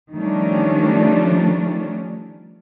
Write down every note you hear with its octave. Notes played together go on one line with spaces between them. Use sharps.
D#3 F3 G3 A3 C#4 D4